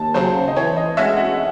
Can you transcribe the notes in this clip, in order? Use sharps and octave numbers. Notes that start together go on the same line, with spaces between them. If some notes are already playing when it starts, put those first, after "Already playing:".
Already playing: D#2 A5
C#3 F#3 C5
D#5
E3 C#5
D#5
G#3 C#4 F#4 E5
F#5